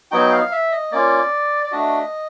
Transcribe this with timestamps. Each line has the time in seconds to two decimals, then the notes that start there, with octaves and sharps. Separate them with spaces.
0.11 F#3 B3 D#4 F#4 G5
0.32 F5
0.52 E5
0.72 D#5
0.92 A#3 C#4 F4 D5
1.64 D5
1.72 A3 D4 F#4 D#5